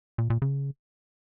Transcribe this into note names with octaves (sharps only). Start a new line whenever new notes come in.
A#2
A#2
C#3